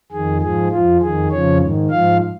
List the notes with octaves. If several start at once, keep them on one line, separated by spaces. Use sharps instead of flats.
F2 D#3 G#4
G#2 F3 G#4
F2 F3 F4
F2 D#3 G#4
F2 C#3 F3 C#5
G#2 D#3
G#2 F3 F5